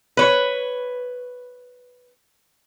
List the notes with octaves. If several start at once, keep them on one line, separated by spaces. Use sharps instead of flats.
B4 C#5